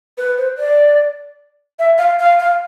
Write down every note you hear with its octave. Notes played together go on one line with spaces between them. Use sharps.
B4
C5
D5
E5
F5
F5
F5